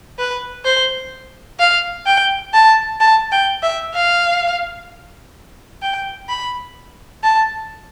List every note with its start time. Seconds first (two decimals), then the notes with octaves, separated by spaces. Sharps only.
0.19 B4
0.65 C5
1.59 F5
2.06 G5
2.54 A5
3.00 A5
3.32 G5
3.63 E5
3.95 F5
5.82 G5
6.29 B5
7.24 A5